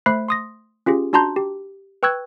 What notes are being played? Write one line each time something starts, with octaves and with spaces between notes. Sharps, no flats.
A3 C5 E5 B5 F#6 C7
C6 D#6 A#6
C#4 F4 G4 G#4
D4 F#4 A5 A#5 C6 G6
G4
B4 G5 C#6 E6 F#6 G#6